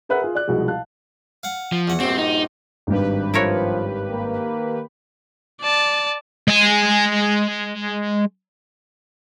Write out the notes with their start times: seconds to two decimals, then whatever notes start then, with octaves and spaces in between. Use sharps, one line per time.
0.09 G#4 A#4 B4 E5 F#5 F#6
0.22 F4 G#4
0.35 D5 F#6
0.47 C2 B2 F3 G#3
0.68 F5 A5 F#6
1.43 F5 F#5
1.72 F3
1.88 E2 F#5
2.00 A#1 G2 C4 F#4
2.18 D#4
2.87 G#1 G2 D#3 G4 B4
3.34 F3 E4 A#4 C#5
4.11 A#3
5.60 D5 A5
6.48 G#3 G#5